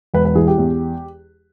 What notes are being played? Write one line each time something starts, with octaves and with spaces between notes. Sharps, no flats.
E1 B4
B4
E3 G#4
G4
E2